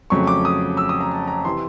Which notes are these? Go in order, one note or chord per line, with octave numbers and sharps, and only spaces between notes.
F2 C#3 F#3 A3 C#6
D6
D#6
E6
D#6
A#5
A5
A#5
C3 E3 C6